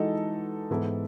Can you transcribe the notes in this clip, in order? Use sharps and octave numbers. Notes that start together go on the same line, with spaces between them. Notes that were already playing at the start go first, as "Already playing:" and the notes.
Already playing: E3 G#3 D#4 F#4 A4
G#2 E3 B3 E4 A4